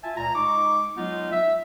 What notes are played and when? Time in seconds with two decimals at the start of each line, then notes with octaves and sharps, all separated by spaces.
0.03 F4 E5 G#5 A5
0.17 C#2 A#2 A#5
0.35 G#3 D#4 C#6 D6
0.97 F#3 G#3 B3 D#4 F4
1.32 E5